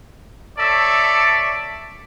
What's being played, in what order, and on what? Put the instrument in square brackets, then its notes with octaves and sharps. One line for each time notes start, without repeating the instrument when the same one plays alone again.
[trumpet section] A4 C#5 D5 E5 A5